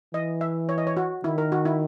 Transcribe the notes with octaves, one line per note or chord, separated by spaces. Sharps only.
E3 D#5
E5
C#5
D#5
C#5
F#4
D#3 E4
A#4
F#4
E4